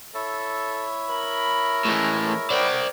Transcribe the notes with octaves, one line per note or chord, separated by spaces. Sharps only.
E4 A4 C#5 E5
A#4 B5
A2 E3 G#3
A#4 C5 D5 F#5 G5